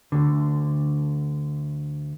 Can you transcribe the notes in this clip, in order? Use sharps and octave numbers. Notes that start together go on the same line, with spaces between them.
D2 D3